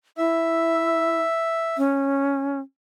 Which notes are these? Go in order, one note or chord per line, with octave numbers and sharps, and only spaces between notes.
E4 E5
C#4